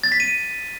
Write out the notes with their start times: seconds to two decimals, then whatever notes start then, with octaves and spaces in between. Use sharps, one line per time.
0.04 A6
0.12 B6
0.20 D#7